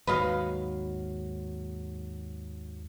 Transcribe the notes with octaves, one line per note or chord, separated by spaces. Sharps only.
D#2 G#2 F#3 B4 D#5 F5